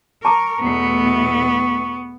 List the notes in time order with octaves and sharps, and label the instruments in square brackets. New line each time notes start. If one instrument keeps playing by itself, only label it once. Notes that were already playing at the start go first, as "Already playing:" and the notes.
[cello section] A#4 [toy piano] A5 A#5 D6 [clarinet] C#6
[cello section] E2 B2 A3 [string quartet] B3